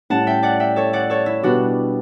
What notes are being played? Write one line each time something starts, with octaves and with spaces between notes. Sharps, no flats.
A2 G3 C#4 F#5 A5
E5 G5
D5 F#5
E5 G5
A4 C#5
D5 F#5
A4 C#5
E4
B2 G3 B3 D4 F#4